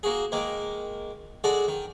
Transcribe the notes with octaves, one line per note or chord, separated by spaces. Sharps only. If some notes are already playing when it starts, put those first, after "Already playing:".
A#3 F#4 G#4
D#3 G#3 A#3
G#3 F#4 G#4 A4 D5
D#3